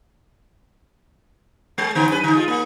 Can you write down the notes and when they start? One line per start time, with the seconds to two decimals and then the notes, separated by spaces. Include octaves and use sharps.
1.78 G#3
1.95 D3 B3
2.09 F#2 B4
2.24 D3 D#4
2.35 G#3 F4
2.48 A#3